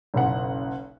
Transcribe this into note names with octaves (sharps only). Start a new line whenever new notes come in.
F#1 B1 F#5